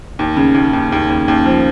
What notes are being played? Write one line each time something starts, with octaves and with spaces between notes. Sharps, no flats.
D#2
C#3
D#2
D#2
D#2
D#2
D#2
F3